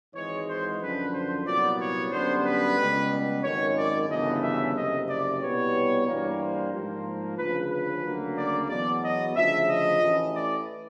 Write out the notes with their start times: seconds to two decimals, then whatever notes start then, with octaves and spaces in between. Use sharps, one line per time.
0.15 G#1 G#2 E3 G#3 C#5
0.48 C5
0.81 F#2 D3 F3 B4
1.13 C5
1.47 C2 A#2 F#3 B3 D5
1.79 C#5
2.12 F#2 D3 G3 B3 C5
2.45 B4
2.78 C#2 B2 G3
3.44 G#1 F#2 D#3 C#5
3.77 D5
4.09 G1 F#2 C#3 E3 A3 D#5
4.43 E5
4.75 F#1 F2 C3 D#5
5.08 D5
5.41 C2 B2 G3 B3 C#5
6.07 G2 E3 G3 A#3
6.39 C5
6.72 G#2 F3 A#3
7.38 D2 C#3 F3 B4
7.71 B4
8.04 D2 C#3 F#3 A#3
8.36 D5
8.69 E2 B2 F#3 D5
9.02 D#5
9.36 D2 C#3 F3 E5
9.69 D#5
10.01 A1 A2 E3
10.35 D5